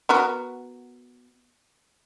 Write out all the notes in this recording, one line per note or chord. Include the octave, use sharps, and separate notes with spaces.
B3 F#4 A#4